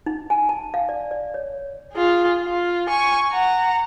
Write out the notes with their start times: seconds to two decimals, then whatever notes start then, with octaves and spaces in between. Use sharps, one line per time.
0.06 D#4
0.30 G#5
0.49 A5
0.74 F5
0.89 D5
1.11 D5
1.34 C#5
1.93 F4 G#4
2.45 F4
2.88 G#5 C#6
3.32 F#5 A#5